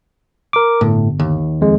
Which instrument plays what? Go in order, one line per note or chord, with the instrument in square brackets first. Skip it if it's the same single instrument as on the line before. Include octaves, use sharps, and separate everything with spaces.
[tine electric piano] A#4 D6
[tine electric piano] G1 [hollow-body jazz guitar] A2
[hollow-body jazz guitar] D#2
[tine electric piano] F2 G#3